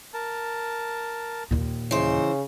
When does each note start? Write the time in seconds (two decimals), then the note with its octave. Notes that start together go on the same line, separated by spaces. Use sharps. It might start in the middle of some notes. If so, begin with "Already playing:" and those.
0.14 A#4 A5
1.51 D#2 A#2
1.91 C#3 E3 D#4 C5